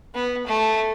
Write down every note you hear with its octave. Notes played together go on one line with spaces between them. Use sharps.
B3
A3